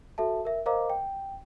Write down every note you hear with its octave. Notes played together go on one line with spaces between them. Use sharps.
F#4 A4 E5 A5
A#4 E5
A#4 C5 D#5 F5 A#5 D6
G5